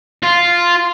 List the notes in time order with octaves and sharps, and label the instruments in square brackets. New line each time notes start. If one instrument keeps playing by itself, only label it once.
[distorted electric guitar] F4